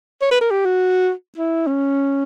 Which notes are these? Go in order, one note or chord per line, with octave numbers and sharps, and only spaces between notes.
C#5
B4
A#4
G4
F#4
E4
C#4